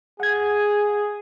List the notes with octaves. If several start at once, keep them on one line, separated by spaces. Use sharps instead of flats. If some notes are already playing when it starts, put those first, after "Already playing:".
G#4 F#5 G#6